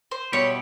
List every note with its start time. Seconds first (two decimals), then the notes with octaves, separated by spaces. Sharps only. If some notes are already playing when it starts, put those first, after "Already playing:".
0.11 C5
0.32 B2 G3 B3 E4 G4 C#5